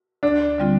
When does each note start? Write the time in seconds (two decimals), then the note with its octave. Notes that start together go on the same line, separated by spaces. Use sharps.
0.23 D2 D4
0.58 D3 G3 C4 F4